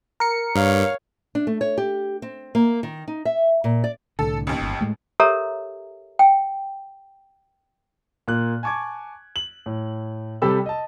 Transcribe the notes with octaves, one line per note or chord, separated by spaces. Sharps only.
A#4 C#7
G2 C#5 F5
D4
A3
C#5
G4
C4
A#3
D#3
D#4
E5
A#2
D5
C2 A2 D3 A4
A1 D#2
G1
A2 G#3 A3
G4 A4 A#4 C#5 E5 A#5
G5
A#2 A#3 F#6
G#5 A5 C#6 D6 G#6
F#7
A2
C3 G3 G4 A4 B5 E6
D#5 A5